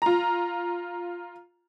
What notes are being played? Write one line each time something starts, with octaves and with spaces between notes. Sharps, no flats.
F4 A#5